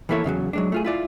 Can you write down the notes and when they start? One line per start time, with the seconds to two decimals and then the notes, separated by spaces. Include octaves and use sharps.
0.09 E3 A#3 E4 A4 C#5
0.24 E2 C#3 E3 F#3
0.53 F#3 G#3 D4
0.72 A3 F4 G#4
0.84 E4 F4 D5